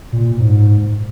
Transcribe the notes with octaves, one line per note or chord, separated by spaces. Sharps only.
A#2
G#2